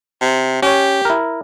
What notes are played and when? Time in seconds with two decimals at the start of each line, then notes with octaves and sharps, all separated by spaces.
0.21 C3
0.62 C#4 G4 C#5
1.05 E4 A#4